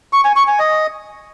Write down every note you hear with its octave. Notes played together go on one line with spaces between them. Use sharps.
C#6
G#5
C#6
G#5
D#5